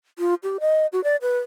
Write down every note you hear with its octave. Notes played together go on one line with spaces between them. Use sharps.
F4
G4
D#5
F#4
D5
B4